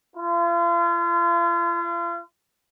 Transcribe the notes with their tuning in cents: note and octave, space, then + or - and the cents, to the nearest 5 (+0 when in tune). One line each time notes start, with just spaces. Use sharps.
F4 -40